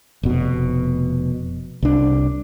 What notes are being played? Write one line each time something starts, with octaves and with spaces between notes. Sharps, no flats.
F1 B2
C2 D4